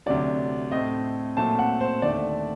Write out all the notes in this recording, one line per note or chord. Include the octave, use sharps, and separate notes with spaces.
D2 C3 F#3 D5
A2 A3 C4 D#5
A#2 F#3 A3 C4 A5
F#5
C5
D#2 D3 A3 D5